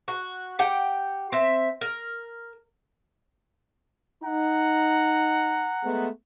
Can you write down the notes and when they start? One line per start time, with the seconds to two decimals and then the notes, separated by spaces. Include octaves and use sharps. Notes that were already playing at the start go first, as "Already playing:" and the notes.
0.08 F#4
0.59 G4 F#5 G5
1.32 C4 E5
1.81 A#4
4.23 D#4 F#5 A#5
5.84 G#3 A3 B3